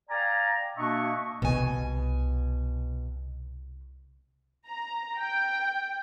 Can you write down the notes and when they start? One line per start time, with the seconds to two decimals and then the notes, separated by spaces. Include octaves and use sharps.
0.10 D5 F5 G5 G#5 A#5
0.77 B2 A#3 D4 D#5 E5 C#6
1.42 C2 B2 G#5
4.67 A#5
5.19 G5